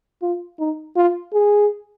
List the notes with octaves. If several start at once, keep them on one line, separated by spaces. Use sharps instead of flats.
F4
D#4
F4
G#4